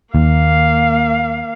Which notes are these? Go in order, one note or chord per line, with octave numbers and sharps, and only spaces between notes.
D#2 A#3 F5